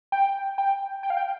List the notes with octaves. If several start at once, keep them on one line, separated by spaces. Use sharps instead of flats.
G5
G5
G5
F5
G5